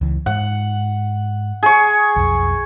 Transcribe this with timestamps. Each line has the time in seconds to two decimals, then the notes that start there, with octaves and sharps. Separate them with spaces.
0.01 C#2 E3
0.26 G#2 F#5
1.63 G#4 C#6
2.16 B1 F2